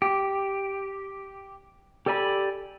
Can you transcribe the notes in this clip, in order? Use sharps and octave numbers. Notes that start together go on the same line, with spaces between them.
G4
G4 A4 D5 G#5 B5